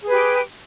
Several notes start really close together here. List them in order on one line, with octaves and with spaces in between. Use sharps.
G#4 B4 G4